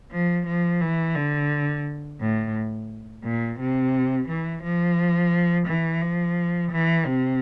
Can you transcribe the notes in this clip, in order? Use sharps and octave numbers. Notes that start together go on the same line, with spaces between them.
F3
F3
E3
D3
A2
A#2
C3
E3
F3
E3
F3
E3
C3